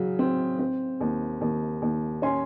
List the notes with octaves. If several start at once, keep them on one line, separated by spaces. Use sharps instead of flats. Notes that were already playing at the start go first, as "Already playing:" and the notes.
Already playing: C#3 F#3
C4
C4
D#2
D#2
D#2
C#4 G#5 C6